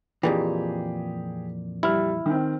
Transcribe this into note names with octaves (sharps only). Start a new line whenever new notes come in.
F2 A#2 E3 G4 G#4
G3 E4 F6
D#3 C4